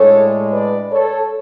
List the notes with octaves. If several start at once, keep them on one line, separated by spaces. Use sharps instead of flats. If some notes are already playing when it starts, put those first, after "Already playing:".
Already playing: A2 G#3 D4 A4 C#5
B4 D5
A4 C#5